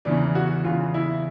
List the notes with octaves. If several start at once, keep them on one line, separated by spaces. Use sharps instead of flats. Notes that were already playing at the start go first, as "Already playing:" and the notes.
E2 C#3 E3 D4
F#4
E2 C#3 E3 F4
E4